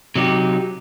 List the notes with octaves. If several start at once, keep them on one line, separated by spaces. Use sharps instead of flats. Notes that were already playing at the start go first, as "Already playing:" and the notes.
C3 F#3 D#4 G4